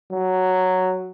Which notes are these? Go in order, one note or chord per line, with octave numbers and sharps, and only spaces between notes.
F#3